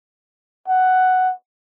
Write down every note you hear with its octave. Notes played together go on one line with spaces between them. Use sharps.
F#5